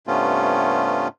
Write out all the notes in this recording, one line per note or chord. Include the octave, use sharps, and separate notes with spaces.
G2 C3 A3 B3 C#4 F4